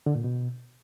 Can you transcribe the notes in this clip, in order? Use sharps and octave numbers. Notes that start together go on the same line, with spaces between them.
D3
A#2
B2